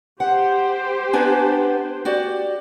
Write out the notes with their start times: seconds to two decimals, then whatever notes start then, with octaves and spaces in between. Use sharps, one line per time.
0.20 G4 C5 F#5
1.13 B3 D4 G#5
2.05 F#4 G4 D5